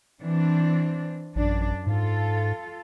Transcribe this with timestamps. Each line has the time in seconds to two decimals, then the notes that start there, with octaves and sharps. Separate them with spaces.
0.21 E3 C4 D4
1.35 A1 F#2 D4
1.86 G#2 F4 A4